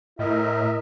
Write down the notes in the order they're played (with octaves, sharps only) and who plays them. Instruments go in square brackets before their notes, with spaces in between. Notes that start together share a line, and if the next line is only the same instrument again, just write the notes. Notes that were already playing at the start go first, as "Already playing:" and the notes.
[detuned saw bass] A2 [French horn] E4 [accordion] A#4 D#5 E5